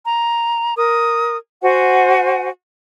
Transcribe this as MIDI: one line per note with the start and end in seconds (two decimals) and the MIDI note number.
0.06 0.74 82
0.77 1.37 70
0.77 1.37 87
1.62 2.48 66
1.62 2.48 72
1.62 2.48 78
1.62 2.48 80